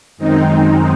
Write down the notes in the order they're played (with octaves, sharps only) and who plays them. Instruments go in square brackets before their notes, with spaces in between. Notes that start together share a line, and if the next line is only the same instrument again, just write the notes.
[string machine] F#2 D#3 G#3 C4 D#4